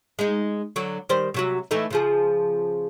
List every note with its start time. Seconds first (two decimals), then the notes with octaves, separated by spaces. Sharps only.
0.19 G#3 D#4
0.76 D3 F#3
1.09 D#3 G3 C5
1.34 C3 F#3 F#4
1.71 E3 A3 D#4
1.91 C#3 F3 G#4